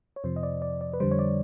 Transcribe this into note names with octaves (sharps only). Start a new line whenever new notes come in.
C#5
F2 C3 F3 C5
D#5
D5
D5
D5
B4
F2 D3 G3 C5
C#5
D5